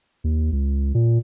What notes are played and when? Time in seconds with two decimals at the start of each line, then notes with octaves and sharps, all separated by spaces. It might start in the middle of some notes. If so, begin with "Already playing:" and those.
0.24 D#2
0.52 C#2
0.95 A#2